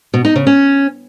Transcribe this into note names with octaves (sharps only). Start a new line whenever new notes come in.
B2
D#4
C#3
C#4